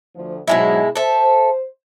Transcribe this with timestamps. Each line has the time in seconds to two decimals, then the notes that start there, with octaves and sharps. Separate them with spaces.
0.15 D2 F3
0.48 G#2 B2 F#3 G#3 E4
0.96 A4 C5 E5